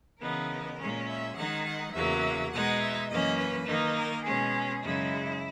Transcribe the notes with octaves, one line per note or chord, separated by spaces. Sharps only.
C#3 E3 B3 D#4 A#4
A#2 G#3 C#4
E5
D#3 G#3 D#4 F#5
F#5
E2 C#3 F#3 A#3 E5
B2 G#3 D#4 F#5
E5
F#2 E3 A#3 C#4 D#5
B4
D#3 A#3 D#4
A#4
B2 G#3 C#4 G#4
F#2 C#3 G#3 D#4 E4